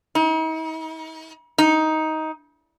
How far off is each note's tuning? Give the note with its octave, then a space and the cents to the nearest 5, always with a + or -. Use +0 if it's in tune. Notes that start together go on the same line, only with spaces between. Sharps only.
D#4 +45
D#4 +15